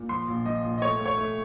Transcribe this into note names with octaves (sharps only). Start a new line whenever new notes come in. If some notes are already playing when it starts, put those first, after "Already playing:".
Already playing: A#2
F3 C6
A#1
F3 D#5
A#1
D#5
A3 C#5
A3
C#5
A3